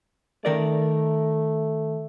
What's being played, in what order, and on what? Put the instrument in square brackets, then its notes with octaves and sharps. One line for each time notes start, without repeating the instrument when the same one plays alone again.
[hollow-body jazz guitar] D#3 A#4 D5 [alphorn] A3